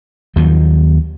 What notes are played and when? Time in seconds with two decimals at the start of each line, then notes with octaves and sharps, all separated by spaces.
0.36 D#2 D#3 F3 F#3